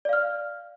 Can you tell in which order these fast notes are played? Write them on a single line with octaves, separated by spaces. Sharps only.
D5 F5 F6